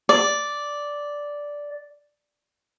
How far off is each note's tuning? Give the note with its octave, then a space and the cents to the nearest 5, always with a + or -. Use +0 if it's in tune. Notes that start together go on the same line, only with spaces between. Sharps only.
D5 -5